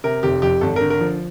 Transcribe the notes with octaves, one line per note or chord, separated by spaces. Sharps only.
C3 A#4
F1 G4
F2 G4
G#1 A4
D3 A#4
A#4
F3